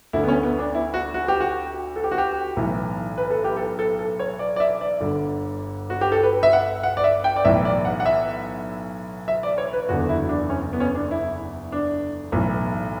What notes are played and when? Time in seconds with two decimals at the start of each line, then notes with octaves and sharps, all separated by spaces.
0.13 D2 D3 E4
0.23 B3
0.28 C#4
0.43 B3
0.59 D4
0.75 E4
0.94 F#4
1.14 F#4
1.28 G4
1.40 F#4
1.96 A4
2.04 G4
2.11 F#4
2.18 G4
2.57 B1 A2 E3
3.18 B4
3.31 A4
3.44 G4
3.57 A4
3.79 A4
3.99 A4
4.19 C#5
4.39 D5
4.56 D5
4.60 E5
4.81 D5
5.01 G1 G2 D3
5.90 F#4
6.01 G4
6.12 A4
6.23 B4
6.43 E5
6.53 F#5
6.83 F#5
6.97 D5
7.04 E5
7.24 G5
7.36 D5
7.45 B1 A2 E3 E5
7.65 D5
7.85 F#5
8.00 F#5
8.06 E5
9.28 E5
9.43 D5
9.58 C#5
9.73 B4
9.89 F#1 E2 D3 F#4
10.09 E4
10.29 D4
10.50 C#4
10.73 B3
10.80 C#4
10.95 D4
11.11 E4
11.72 D4
12.32 B1 A2 E3